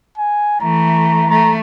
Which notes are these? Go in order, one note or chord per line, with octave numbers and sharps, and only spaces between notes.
G#5
E3 A3 A#5
A3 A#5